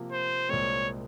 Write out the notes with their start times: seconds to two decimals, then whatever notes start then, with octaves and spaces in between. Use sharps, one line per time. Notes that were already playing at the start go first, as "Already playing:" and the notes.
Already playing: C3 F3 A#3
0.12 C5
0.49 C2 A#2 G#3 C4 C#5